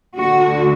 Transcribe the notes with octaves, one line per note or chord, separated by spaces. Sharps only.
D2 D3 F#4